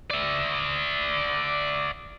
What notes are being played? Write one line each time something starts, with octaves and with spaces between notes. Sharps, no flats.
D5 E5